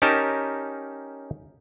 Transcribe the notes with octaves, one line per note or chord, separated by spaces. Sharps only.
C#4 D#4 G4 A#4 G5 A5